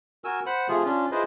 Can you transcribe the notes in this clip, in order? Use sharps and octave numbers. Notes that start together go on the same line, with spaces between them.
F#4 A#4 G#5 E6
C5 F#5 B5
C3 F3 A3 F4 G#4
C#4 D4 F4
E4 F4 G#4 B4 C5 D#5